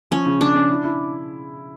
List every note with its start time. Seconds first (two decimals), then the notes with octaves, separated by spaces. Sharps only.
0.11 F3 C#4
0.26 C#3
0.40 C#3 D4
0.55 C#4
0.70 E4
0.84 E4